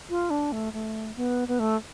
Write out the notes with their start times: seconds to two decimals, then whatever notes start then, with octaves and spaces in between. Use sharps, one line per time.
0.10 F4
0.30 D4
0.52 A3
0.73 A3
1.16 B3
1.48 B3
1.59 A3